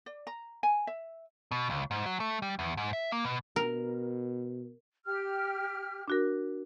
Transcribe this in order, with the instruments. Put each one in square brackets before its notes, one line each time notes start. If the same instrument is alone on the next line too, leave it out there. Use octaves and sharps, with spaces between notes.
[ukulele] D5
A#5
G#5
E5
[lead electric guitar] B2
C#2
G#2
F#3
A3
G3
E2
G#2
E5
A#3
B2
[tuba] B2 [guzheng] A#4
[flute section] G4 F6
[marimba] D4 F#4 A#4